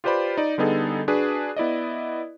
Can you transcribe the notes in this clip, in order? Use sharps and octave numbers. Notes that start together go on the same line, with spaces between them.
F4 G4 B4 C5 D5 B5
D#4 D5
D3 G3 B3 D#4 G#4 A4
D4 F#4 G#4 B4
B3 E4 D5 D#5